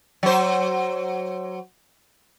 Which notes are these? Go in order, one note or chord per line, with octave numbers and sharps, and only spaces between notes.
F#3 C5